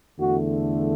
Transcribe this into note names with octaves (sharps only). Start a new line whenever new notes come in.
E2 D3 A3 F#4